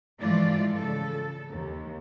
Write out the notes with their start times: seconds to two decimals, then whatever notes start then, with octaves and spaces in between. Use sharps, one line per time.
0.19 G#2 E3 F3 A3 F4 D5
0.78 C#3 A4
1.51 D#2